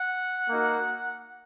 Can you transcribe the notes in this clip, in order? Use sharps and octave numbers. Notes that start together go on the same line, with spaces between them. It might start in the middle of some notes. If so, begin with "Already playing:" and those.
Already playing: F#5
A#3 D#4 F#4